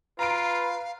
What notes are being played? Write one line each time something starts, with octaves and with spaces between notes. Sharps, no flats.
F4 B4 F5 A#5 D7